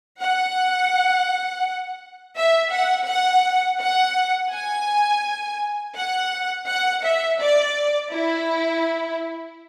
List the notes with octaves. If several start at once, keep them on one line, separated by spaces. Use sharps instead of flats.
F#5
E5
F#5
F#5
F#5
G#5
F#5
F#5
E5
D5
E4